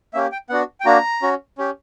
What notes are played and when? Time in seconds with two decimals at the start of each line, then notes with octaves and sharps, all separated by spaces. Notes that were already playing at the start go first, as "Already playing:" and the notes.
0.13 A#3 C#4 G4 E5
0.32 G5
0.49 B3 D4 F#4 F#5
0.80 G5
0.85 A#3 D4 F#4 A#5
1.22 C#4 F#4
1.58 C#4 G4